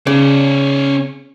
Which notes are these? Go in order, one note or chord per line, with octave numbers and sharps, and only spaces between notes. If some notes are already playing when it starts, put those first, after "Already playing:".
C#3 C#4 D5